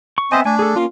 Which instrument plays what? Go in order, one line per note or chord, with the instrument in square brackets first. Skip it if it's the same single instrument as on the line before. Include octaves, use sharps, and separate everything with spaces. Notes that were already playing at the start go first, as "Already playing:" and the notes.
[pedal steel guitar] C#6
[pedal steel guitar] B3 E5 G#5 [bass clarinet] C4 [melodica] C5 D#5
[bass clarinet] A3 [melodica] D4 [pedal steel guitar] G#5
[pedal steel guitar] G#4 A4
[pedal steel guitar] A#3 C#4 [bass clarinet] F4